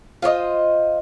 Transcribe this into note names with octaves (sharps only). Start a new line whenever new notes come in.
F4 C5 C#5 D#5